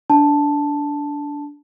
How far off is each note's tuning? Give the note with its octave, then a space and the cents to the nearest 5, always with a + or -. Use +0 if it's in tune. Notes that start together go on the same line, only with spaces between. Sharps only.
D4 -15 A5 +0